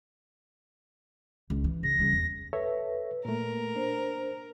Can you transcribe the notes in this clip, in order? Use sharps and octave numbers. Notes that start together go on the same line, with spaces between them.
C#2 D3
E3
C#3 A#6
C#3 G3
E2
A4 B4 C#5 E5
A#2 A3 A#3 A#4
D4 C5